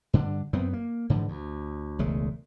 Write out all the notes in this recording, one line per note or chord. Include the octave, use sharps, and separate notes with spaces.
G2 D3 D4
F#2 B3 C4
A#3
G#2 D3 E3 F3
D2
E1 C#2 G#3 A3